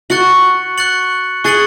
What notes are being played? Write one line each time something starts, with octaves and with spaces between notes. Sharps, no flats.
F#4 C#6 F#6 A6 C#7 F#7
C#6 F#6 A6 C#7 F#7
G#4 C#6 F#6 A6 C#7 F#7